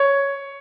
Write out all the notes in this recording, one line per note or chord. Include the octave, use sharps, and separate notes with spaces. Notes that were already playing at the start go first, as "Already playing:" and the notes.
Already playing: C#5